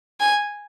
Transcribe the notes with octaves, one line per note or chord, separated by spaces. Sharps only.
G#5